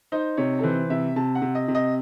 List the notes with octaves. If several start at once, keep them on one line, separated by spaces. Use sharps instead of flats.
D#4 C5
C3 C#5
A4
E3 C5
C3 E5
C3 A5
F#5
C3
D#5
C3
D#5